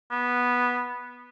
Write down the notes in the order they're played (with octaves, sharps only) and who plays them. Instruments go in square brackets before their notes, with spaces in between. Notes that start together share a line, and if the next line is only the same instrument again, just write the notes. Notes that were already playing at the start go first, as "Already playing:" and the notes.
[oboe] B3